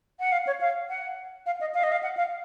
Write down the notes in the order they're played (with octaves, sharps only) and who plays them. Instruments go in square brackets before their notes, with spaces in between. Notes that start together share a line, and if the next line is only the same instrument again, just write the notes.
[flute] F#5
F5
C#5
F5
F#5
F5
D#5
F5
D#5
F5
F#5
F5